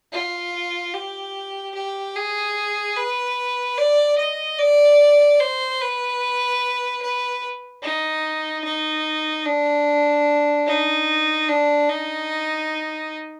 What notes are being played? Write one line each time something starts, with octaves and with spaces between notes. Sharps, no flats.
F4
G4
G4
G#4
B4
D5
D#5
D5
C5
B4
B4
D#4
D#4
D4
D#4
D4
D#4